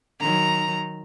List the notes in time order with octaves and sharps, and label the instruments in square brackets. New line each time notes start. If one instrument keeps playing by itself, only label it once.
[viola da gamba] D#3 F#3 [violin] A#5